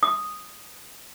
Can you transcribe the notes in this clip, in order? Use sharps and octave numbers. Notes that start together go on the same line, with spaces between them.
D#6